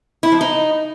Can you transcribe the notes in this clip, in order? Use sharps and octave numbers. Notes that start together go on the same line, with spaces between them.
E4
F3
D#4